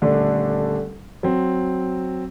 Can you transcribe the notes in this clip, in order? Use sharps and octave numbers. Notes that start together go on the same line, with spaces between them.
D#1 D3 A3 D4
F#3 C4